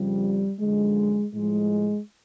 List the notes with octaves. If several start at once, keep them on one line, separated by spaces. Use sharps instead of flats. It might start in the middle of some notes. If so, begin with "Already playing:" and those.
Already playing: F2 C#3 F3 G3
F#2 D3 F3 G#3
A2 F3 G#3